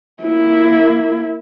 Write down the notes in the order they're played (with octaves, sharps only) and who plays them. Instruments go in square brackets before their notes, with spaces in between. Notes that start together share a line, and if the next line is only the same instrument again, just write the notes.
[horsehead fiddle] A#3 E4